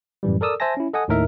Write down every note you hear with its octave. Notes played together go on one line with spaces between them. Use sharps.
F#2 A2 E3 G3
A4 A#4 D5 D#6 E6
C5 E5 G#5 A5 A#6
C#4 E4
A4 D#5 F#5 G#5 D#6
D#2 A2 D#4 A#4 E5